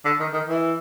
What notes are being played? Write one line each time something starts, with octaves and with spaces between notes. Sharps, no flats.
D3
D#3
D#3
E3